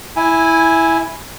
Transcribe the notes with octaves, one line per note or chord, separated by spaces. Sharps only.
E4 G#5